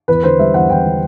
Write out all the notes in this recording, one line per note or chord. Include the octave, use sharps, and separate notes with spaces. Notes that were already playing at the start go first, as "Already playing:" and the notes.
E2 B4
D3 C5
G3 E5
E2 F#5
E2 G5
D3